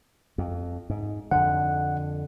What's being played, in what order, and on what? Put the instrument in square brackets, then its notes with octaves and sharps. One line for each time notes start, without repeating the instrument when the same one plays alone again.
[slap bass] F2
G#2
[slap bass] F2 D3 [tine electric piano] F#5